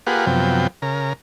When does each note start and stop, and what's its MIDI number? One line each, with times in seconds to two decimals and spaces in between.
0.07 0.26 58
0.07 0.26 65
0.07 0.26 67
0.07 0.26 68
0.07 0.26 71
0.07 0.26 78
0.26 0.67 42
0.26 0.67 48
0.26 0.67 53
0.26 0.67 59
0.26 0.67 79
0.82 1.13 49
0.82 1.13 70